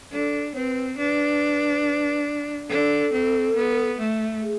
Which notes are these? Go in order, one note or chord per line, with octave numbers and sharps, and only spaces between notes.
D4 A4
C4 B4 C#5
D4 B4
D4 A4
C4
B3
A3
G#4